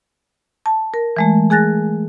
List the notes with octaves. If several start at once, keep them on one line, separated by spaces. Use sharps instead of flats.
A5
A#4
E3 G#3 A3
G#4 G#5 F#6 A6 A#6